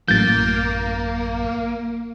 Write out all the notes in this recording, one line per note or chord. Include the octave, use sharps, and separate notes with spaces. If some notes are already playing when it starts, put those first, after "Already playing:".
A1 F#2 A2 A#3 G6 A6